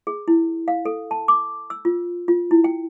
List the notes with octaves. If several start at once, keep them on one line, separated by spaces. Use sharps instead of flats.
G#4
E4
F5
A4
A5
D6
E6
F4
F4
E4
G5